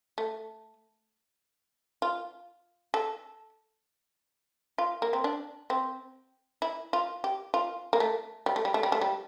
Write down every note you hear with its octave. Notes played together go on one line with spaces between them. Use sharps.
A3
F4
A4
F4
A#3
C4
D4
C4
E4
F4
G4
F4
A#3
A3
G3
A3
G3
A3
G3
A3
G3